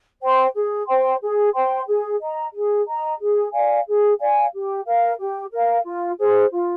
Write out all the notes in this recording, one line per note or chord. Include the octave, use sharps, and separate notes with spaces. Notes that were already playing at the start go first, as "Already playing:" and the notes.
C5 G5 C6
G#4
C5 G5 C6
G#4
C5 G5 C6
G#4
D#5 A#5
G#4
D#5 A#5
G#4
D5 F5 G#5
G#4
D5 F5 G#5
G4
A#4 F5
G4
A#4 F5
F4
G#4 C5
F4